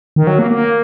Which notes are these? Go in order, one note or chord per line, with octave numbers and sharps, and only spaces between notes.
D#3
F#3
A#3
A#3